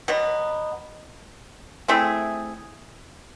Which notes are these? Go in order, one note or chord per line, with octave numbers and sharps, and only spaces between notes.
B2 F#3 B3
A3 C4 E4 G#4